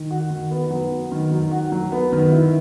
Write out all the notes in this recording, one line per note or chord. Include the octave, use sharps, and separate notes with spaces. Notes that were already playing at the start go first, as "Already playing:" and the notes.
Already playing: D#3
F#4
D#3
B3
F#3
B3
D#3
F#3
F#4
F#3
B3
D#3
E4